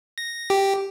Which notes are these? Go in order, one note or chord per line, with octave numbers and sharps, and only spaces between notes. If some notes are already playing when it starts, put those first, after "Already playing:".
A#6
G4